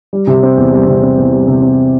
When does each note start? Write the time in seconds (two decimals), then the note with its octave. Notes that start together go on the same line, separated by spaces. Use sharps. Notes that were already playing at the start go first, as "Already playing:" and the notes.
0.13 G3
0.27 C3
0.43 C4
0.57 E2
0.73 G3
0.87 C3
1.03 C4
1.18 E2
1.33 G3
1.48 C3
1.62 C4